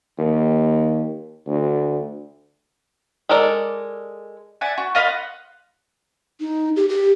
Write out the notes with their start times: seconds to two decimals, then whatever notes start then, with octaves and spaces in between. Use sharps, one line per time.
0.18 D#2
1.47 D2
3.29 G#3 A4 A#4 D5
4.61 D5 E5 F#5 G#5
4.78 F#4
4.95 F4 D#5 F5 B5
5.08 F#5
6.40 D#4
6.76 G4
6.89 G4